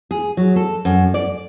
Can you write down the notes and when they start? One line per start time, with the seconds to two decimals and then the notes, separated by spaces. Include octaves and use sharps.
0.11 G#4
0.37 F#3
0.56 A4
0.85 F#2
1.14 D5